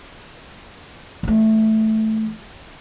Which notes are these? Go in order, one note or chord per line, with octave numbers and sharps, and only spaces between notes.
E3 A3